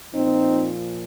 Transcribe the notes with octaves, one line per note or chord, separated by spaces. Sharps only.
A#2 F3 C4 D#4